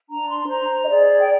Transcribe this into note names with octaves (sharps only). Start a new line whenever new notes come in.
D4 A#5
C6
C5 A#5
A#5
D#5
G#4 D5
G5